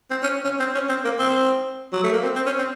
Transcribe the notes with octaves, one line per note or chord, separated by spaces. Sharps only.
C4
C#4
C#4
C4
C#4
C4
A#3
C4
F#3
A3
A#3
C4
C4
C#4
C4